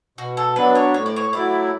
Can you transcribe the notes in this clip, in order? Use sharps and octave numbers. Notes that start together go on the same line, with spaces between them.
B2 F#4
A4
F#3 B3 D4 B4
C#5
A2 C#5
D5
C#5
F#3 A3 E4 D5